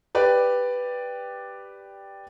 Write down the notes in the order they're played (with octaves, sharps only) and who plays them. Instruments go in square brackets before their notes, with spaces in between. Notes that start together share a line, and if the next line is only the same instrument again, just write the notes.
[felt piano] G4 B4 D5